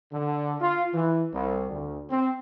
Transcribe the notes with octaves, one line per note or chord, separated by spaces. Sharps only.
D3
F4
E3
C2
D2
C4